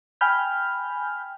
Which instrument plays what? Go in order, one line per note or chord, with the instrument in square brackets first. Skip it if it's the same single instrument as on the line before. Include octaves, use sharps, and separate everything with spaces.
[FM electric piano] G5 G#5 B5 F6 G6